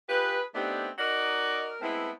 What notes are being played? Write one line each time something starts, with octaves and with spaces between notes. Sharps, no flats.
F4 G4 G#4 B4
A3 B3 C4 D4 D#4 G4
D#4 F#4 A#4 D5 D#5
G#3 A3 B3 C4 E4